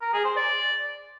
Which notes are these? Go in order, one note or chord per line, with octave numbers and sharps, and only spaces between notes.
A#4
G#4
C5
D5